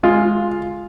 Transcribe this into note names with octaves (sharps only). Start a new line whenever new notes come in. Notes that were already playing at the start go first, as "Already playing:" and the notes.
G#3 F4